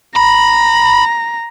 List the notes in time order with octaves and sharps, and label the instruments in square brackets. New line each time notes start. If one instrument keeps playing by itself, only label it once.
[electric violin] A#5 [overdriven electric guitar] B5